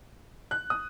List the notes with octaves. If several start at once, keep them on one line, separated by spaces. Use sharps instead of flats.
F#6
D#6